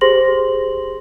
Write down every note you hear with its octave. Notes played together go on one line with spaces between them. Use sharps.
G4 G#4 C5 C6 A#6 F#7